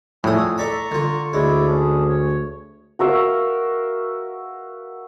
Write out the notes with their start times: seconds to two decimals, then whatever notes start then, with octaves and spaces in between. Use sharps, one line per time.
0.24 F2 A2 D4 G#4 A4 D#6
0.58 A4 D5 E5 A#5 C#6
0.91 D3 F4
1.33 D2 G#3 E4 C#5 D5
1.67 C#4 D4 G#4
2.09 C#5
2.99 F#4 A#4 E5 F5